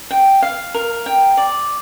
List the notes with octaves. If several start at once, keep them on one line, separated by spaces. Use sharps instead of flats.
G5
F5
A#4
G5
D5